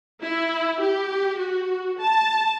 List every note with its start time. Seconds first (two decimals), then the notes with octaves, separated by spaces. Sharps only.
0.23 E4
0.81 G4
1.39 F#4
2.01 A5